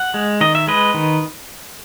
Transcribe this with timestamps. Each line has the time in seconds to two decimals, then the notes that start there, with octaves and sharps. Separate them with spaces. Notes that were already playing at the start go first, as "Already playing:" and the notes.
Already playing: F#5
0.14 G#3
0.41 D#3 D#5
0.55 E5
0.67 G#3 B4 D#5
0.94 D#3